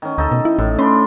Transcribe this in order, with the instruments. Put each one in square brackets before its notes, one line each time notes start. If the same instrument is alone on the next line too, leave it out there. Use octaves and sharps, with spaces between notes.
[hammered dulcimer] D#3 C#4
[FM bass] D2 [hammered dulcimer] D#4 A4
[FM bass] B2
E4
[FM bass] A1 [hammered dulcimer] A2
[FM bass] C#4 [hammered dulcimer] D4 B5 C6